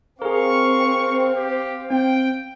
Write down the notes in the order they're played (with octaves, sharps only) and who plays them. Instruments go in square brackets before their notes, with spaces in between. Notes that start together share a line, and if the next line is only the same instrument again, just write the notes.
[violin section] C4 [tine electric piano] G#4 A#4 [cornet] F5 [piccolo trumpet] C#6
[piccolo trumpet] G4
[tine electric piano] C4 [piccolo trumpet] G5